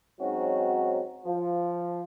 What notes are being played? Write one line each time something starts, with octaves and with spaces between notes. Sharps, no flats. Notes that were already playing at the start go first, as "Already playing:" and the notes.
G#2 F#3 C4 C#4 D#4 F#4
F3